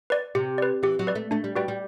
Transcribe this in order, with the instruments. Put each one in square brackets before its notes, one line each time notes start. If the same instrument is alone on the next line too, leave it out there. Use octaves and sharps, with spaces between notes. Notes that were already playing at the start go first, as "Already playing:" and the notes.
[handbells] B4 D5
[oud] C3 [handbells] G4
[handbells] B4 D5
[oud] E3 [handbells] G4
[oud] F#3
[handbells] B4 D5
[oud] A3
[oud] A3 [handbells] D4
[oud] G3
[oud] G3 [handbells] F#4 B4 D5 G5
[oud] G3